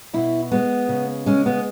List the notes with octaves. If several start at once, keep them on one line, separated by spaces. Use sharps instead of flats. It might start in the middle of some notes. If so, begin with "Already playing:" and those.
B2 E4
G#3 B3
C#3
G#3 C#4
B3